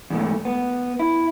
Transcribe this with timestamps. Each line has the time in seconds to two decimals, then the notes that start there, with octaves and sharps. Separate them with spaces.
0.10 E2 G#2 A3
0.45 B3
0.99 E4